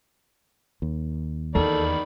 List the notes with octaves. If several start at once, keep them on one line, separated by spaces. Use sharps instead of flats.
D#2
E2 D#3 A4 D5 B5